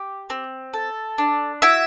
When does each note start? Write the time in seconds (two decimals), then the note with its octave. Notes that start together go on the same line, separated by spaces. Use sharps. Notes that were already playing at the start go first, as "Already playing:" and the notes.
Already playing: G4
0.30 C4
0.73 A4
1.18 D4
1.62 E4 F#4 E5